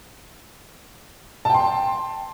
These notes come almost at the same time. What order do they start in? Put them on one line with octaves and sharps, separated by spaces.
A5 G5 C6